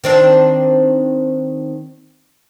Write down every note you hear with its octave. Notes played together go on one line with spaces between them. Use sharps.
D#3 C4 D4